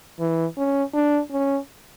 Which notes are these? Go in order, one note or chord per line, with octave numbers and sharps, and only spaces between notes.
E3
C#4
D4
C#4